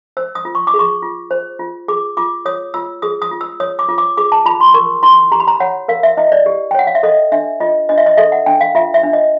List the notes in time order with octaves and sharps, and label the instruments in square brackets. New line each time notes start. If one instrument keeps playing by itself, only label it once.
[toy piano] C5 E6
D#6
F4
C#6
D6
G#4
C#6
F4
C5
F4
G#4 D6
F4 D6
C#5 D#6
F4 E6
G#4 D#6
D#6
F4
E6
C#5 D#6
D6
F4
D6
G#4 D6
A5
F4 B5
C6
A#4 C#6
E4 C6
G4 A#5
B5
A#5
C#5 F#5
A#4 F5
E5
E4 D#5
D5
G4
G5
C#5 F#5
F5
E5
A4 D#5
D4 E5
F4 D#5
D4 D#5
E5
D#5
A4 E5
F#5
D4 G5
F5
F4 E5
E5
D4
D#5